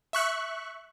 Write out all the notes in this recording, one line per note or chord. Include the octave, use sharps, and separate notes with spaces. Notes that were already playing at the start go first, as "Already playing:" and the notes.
E5 C#6 F#6